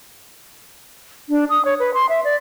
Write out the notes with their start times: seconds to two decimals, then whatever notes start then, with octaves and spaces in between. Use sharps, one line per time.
1.29 D4
1.50 D#6
1.65 C#5
1.80 B4
1.94 C6
2.09 E5
2.24 D5